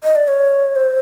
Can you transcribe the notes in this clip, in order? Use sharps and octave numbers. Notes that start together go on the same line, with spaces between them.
D#5
D5
C#5
C5